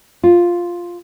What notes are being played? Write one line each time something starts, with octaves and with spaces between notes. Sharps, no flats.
F4